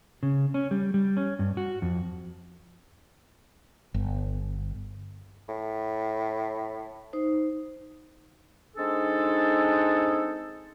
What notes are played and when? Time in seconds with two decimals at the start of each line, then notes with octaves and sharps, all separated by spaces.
0.23 C#3
0.54 C#4
0.71 G3
0.94 G3
1.17 C#4
1.39 G2
1.57 F#4
1.82 F2
3.94 G1
5.48 A2
7.13 D#4 C5
8.77 G#3 C4 D4 D#4 G#4 A4